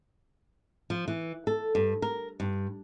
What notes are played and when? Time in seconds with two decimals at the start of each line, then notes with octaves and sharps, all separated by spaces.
0.90 F3
1.08 E3
1.47 A4
1.75 G2
2.02 A#4
2.40 G2